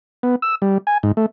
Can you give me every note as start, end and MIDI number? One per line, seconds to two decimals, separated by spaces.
0.23 0.35 59
0.42 0.55 88
0.62 0.78 55
0.87 0.98 80
1.03 1.12 44
1.17 1.26 57